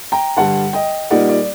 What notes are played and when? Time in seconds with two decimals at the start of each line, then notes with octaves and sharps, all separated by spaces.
0.12 G5 A#5
0.36 G2 D3 G3 F#5 A5
0.73 D#5 G5
1.10 A#2 G3 A#3 D#4 D5 F#5
1.29 D5